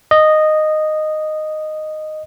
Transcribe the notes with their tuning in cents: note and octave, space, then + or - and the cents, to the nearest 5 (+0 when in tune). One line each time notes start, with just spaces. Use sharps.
D#5 -10